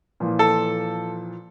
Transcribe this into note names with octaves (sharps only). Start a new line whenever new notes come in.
A#2 E3 F3
A4